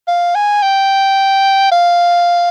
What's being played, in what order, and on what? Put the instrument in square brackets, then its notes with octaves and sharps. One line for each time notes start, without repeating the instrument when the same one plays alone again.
[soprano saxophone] F5
G#5
G5
F5